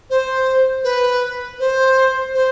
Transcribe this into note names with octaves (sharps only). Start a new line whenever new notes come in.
C5
B4
C5
C5